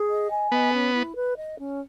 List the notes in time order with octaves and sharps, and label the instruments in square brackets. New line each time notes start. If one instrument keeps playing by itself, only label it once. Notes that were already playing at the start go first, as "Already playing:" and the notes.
Already playing: [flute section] G#4
D#5
G#5
[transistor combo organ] B3 [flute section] D#5
[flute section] C#4
E4
B4
D#5
C#4